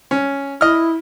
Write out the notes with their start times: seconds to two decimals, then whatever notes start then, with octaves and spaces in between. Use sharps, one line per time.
0.11 C#4
0.61 E4 D#5 F6